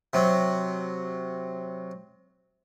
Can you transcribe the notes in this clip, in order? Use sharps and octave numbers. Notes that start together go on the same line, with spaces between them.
C3 F#3